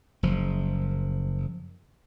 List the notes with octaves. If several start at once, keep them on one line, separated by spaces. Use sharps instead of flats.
F#1 F3